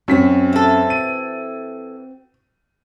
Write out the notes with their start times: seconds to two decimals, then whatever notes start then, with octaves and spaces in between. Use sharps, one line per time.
0.08 F#2 C4 F#4 B6
0.53 E3 A4
0.90 D#7